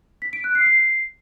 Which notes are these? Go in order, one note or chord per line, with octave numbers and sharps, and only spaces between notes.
B6
D7
F#6
C7
C7